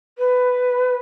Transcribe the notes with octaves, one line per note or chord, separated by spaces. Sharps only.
B4